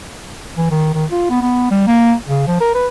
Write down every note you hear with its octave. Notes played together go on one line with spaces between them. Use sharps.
E3
D#3
D#3
F4
B3
B3
G3
A#3
C#3
F3
A#4
B4